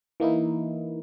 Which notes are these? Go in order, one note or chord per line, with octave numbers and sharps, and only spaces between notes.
E3 A#3 D#4 E4